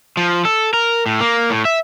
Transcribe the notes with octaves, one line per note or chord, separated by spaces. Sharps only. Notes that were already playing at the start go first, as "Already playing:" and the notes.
F3
A4
A#4
A2
A#3
A2
E5